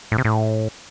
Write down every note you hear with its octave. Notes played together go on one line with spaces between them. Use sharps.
A2
C3
A2